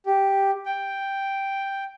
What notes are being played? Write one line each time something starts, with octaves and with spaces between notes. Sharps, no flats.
G4
G5